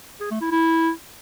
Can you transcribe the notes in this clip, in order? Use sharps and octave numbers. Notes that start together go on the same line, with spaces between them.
G#4
A3
E4
E4